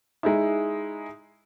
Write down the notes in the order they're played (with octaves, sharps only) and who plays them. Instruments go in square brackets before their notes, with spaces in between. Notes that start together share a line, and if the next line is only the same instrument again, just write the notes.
[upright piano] G#3 D#4 E4